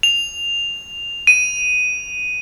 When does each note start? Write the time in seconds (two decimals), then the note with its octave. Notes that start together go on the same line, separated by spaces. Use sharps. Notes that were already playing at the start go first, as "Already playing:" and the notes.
0.03 F7
1.27 D#7